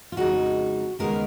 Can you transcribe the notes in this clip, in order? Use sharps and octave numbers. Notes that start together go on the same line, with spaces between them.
F4
F2 C#3 G#3 D#4 F#4
D#2 C#3 G#3 B3 D#4 A#4